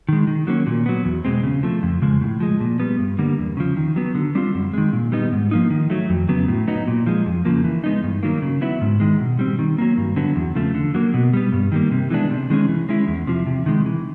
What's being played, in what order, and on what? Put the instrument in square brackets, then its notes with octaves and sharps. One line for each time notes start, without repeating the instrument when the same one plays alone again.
[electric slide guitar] D#3 G#3
D#3
F#3 A#3 C#4
A#2
F#3 B3
E2
B2 G#3 C4
C#3
F3 A3
F2
C#3 F3 G#3
A2
F3 G#3
A#2
G3 B3
G2
D3 G3 A#3
E2
C#3 F3
D#3
F#3 B3
D3
G3 C4 F4
F#2
D#3 G#3
A#2
G3 B3 D#4
G#2
F3 A#3 D#4
D#3
F#3 A3
F2
C#3 F#3 B3
A2
F#3 B3 D#4
A#2
F3 G#3
F2
C#3 F3 A#3
E3
G#3 B3 D#4
G2
D#3 F#3 A#3
C#3
F#3 B3 E4
G#2
D#3 G#3
B2
G3 C4
D#3
F#3 A#3
G2
D3 F#3 B3
E2
C#3 F3 A3
D3
F#3 A#3
B2
G3 B3
G2
D#3 G3 A#3
C3
E3 G#3 B3 D4
C3
D#3 G#3 C#4
E3
G#3 C#4 E4
E2
C3 F3
C3
D#3 G#3
E3